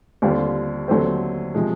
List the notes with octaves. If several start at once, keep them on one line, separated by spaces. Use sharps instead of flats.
D#2 D3 G3 C4 F4
D#2 D3 F#3 A3 C4
C3 F3 G#3